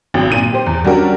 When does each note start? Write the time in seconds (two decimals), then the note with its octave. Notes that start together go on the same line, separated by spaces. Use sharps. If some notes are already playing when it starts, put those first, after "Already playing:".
0.14 G#1 F#3
0.31 A#2 D#7
0.52 G4 C5
0.66 E2
0.84 F#3 G3 C#4 D4 F#4 A#4